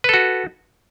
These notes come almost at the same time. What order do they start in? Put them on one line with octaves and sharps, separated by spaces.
B4 A4 F#4